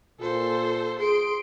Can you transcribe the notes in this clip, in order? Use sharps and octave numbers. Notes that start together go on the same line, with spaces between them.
A#2 F4 A4 C5
G#4 C6 D7